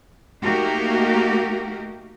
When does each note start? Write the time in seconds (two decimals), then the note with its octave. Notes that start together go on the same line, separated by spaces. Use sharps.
0.43 A3 A#3 D#4 F#4 G4 A#4